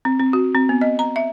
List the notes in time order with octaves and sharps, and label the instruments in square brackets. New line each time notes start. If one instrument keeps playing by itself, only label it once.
[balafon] C4
C4
F#4
C4
B3
D#5
A#5
E5